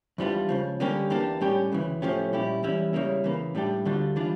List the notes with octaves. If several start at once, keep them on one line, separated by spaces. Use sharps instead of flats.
E2 E3 G3 D4 F4
C#2 C#3 F3
D3 G3 A#3 C#4 G4
E2 E3 A#3 D4 G4
A2 G3 C#4 G4
D2 C#3 E3
A2 F3 A3 C#4 G4
A#2 G3 C#4 E4 G4
E2 E3 G3 C#4 E4
C#3 G3 A#3 E4
C#3 E3 A#3
A2 G3 D4 G4
D2 D3 G3 D4 F4
E3 G3 D4 F4